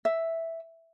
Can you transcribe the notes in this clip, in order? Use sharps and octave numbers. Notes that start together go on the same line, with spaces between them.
E5